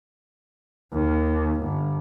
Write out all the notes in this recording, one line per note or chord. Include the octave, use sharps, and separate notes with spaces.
D#2
G1